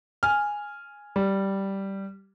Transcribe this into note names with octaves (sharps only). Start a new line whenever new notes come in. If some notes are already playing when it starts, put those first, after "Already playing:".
G#5 F6
G3